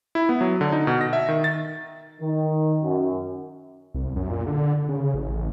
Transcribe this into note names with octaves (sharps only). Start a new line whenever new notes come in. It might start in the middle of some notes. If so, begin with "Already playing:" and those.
E4
B3
F#3
D3
D#4
B2
A#6
E5
D#3
A6
D#3
F#2
C2
F#2
A#2
D3
C#3
A1
A1